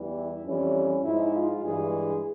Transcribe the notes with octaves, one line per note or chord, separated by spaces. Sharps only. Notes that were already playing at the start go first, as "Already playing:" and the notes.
Already playing: E2 E3 G3
E4
F2 E3 G3 C#4
G#2 F3 G#3 E4
F4
G2 E3 G#3 G#4